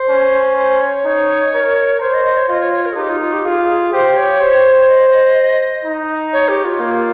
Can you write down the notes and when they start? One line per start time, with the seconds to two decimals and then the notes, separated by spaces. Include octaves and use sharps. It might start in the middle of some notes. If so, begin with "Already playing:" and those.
Already playing: C5
0.09 C#4
0.57 C5
0.81 C#5
1.05 D#4
1.54 A#4
2.01 C5 C#5
2.14 D#5
2.25 D#5
2.37 C#5
2.49 F4 D#5
2.61 C#5
2.73 C#5
2.86 A#4
2.93 G#4
2.97 D#4 G4
3.09 F4
3.20 F4
3.33 G4
3.45 F4 G#4
3.69 G#4
3.92 G4 C5
4.17 C#5
4.40 C5
4.88 D#5
5.85 D#4
6.33 C#5
6.48 G4
6.65 F4
6.80 A#3